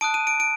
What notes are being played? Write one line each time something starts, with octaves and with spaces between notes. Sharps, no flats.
A5 D#6 F#6 D7
D#7
D7
D7